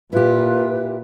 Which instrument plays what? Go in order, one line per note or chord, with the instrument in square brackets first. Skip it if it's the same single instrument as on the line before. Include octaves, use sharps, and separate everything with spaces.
[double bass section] A#2 [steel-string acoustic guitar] E4 G4 [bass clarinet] F4 [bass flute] B4